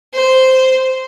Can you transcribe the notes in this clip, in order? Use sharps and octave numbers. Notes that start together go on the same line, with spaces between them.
C5